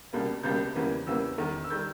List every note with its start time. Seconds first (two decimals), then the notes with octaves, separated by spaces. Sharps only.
0.13 C#2 B2 G3 A#3
0.43 C#2 B2 G3 A#3 G6
0.75 E2 C#3 E3 G3 A#3
1.07 E2 C#3 E3 G3 A#3 E6
1.38 E2 D#3 G3
1.64 E6
1.70 D#3 G3 G6